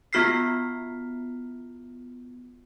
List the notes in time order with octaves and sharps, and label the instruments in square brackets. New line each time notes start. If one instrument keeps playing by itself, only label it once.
[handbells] B3 F4 F#4 F6 B6 C7